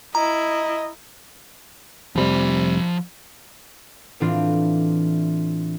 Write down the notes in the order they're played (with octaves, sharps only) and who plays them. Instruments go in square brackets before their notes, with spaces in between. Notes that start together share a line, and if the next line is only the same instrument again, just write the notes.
[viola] E4 [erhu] D#5 [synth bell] A#5
[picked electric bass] F1 C3 G3 [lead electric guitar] F3 B5
[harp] A2 E3 C4 D4 F4